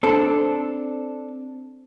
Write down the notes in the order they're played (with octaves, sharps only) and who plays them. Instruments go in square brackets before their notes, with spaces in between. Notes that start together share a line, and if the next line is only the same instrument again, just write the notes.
[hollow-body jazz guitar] C4 D4 A4